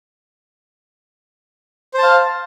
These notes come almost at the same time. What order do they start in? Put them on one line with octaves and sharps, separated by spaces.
C5 A5 F5